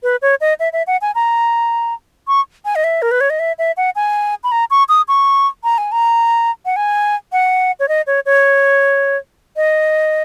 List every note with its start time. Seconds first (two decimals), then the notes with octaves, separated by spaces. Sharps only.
0.03 B4
0.22 C#5
0.41 D#5
0.60 E5
0.73 E5
0.87 F#5
1.02 G#5
1.15 A#5
2.28 C#6
2.65 G#5
2.76 D#5
2.84 E5
3.02 A#4
3.11 B4
3.21 C#5
3.30 D#5
3.39 E5
3.59 E5
3.77 F#5
3.96 G#5
4.44 B5
4.52 A#5
4.70 C#6
4.89 D#6
5.08 C#6
5.64 A#5
5.78 G#5
5.92 A#5
6.66 F#5
6.76 G#5
7.32 F#5
7.80 C#5
7.88 D#5
8.07 C#5
8.26 C#5
9.56 D#5